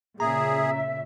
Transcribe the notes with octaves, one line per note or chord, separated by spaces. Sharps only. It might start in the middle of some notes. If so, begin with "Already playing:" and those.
A#2 C#3 G#4 E5 A#5